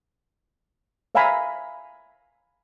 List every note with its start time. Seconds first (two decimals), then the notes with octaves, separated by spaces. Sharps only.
1.15 C#5 E5 F5 G#5 A#5 B5